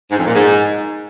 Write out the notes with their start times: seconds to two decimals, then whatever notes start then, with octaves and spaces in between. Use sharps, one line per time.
0.10 G#2
0.18 F2
0.27 A#2
0.35 G#2